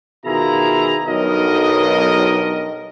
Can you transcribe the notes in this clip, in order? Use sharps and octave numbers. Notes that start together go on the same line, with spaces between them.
B2 D#3 E4 F4 G#4 A#5
B1 G2 A#4 D#5